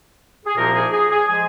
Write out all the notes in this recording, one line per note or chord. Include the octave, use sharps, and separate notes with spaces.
G#4
C2 A#2 F3 A#3 D#4 A#4
G#4
G#4
G#4
F3 G#3 G#5